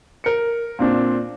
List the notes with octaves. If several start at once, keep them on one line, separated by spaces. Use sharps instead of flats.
A#4 C#7
A#2 C4 D4